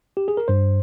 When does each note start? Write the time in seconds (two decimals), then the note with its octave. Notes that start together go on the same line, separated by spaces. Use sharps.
0.17 G4
0.28 G#4
0.37 A#4
0.48 G2 C5